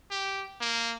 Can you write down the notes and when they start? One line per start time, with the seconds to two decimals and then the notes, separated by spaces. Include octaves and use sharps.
0.11 G4
0.60 A#3